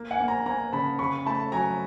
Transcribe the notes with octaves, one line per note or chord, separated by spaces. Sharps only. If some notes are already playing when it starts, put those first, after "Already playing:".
Already playing: A#3
F#5 G#5
A#3
G#5 A#5
A#3 G#5 A#5
C#3 A5 B5
C#3 B5 C#6
A3 A5 B5
F#3 G#5 A#5